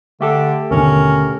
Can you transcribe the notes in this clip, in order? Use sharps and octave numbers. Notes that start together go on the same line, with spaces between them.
D3 A3 G4 A4
D#2 B2 D3 C#4 A#4